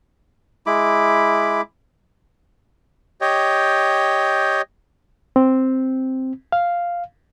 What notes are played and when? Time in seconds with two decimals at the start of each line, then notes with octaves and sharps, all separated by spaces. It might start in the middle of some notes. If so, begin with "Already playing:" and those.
0.66 G#3 E4 B5 D6
3.21 G4 C#5 D#5 G5
5.36 C4
6.52 F5